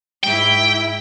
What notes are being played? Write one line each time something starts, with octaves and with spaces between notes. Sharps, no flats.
G#2 E4 G5